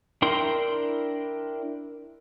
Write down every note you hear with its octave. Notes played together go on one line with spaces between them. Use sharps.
D4 E4 A#4 G5 C6